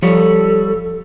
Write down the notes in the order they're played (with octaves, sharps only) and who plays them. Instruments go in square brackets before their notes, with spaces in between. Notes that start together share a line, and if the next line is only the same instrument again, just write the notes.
[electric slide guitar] F3 G3 C#5 [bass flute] A4